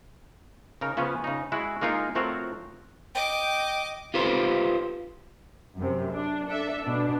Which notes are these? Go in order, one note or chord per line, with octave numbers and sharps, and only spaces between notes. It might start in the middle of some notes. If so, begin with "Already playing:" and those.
C#3 D#4 A#4
C#3 F3 B3 C#4
C#3 D#4
G#3 E4 F#4
G#3 A#3 D#4 F4 A#4
F3 A3 C4 F#4 A#4 C#5
D#5 G5 D6
F4 G4 A4 B4 C5
F#2 C3
D4
D4 A4 E5
B2 D4